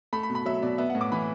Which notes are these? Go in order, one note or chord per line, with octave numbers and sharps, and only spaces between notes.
A3 B5
B5
B2
B5
F#3 E5
B2 D5
B3 E5
F#5
A2
D6
E3 B5